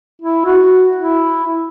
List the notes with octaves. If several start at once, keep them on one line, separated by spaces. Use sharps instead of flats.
E4
F#4
E4